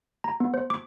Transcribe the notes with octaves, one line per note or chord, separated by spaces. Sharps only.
A#5
B3
C5
D6